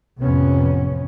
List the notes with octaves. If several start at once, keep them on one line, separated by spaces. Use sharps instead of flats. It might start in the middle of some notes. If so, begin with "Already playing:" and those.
A1 F2 C3 B3 C#4